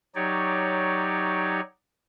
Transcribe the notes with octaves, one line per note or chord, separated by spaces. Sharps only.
F#3 D#4 G4 C#5 D5